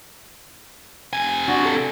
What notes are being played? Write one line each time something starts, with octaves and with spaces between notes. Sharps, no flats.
C3 G#5
D4 F#4
A4